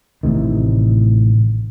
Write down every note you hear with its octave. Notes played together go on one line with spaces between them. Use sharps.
A1 A2 C3 D#3